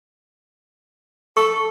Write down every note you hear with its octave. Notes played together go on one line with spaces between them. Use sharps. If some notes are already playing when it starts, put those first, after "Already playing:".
A4 C#6